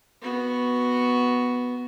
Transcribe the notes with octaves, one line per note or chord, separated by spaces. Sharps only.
B3 F#4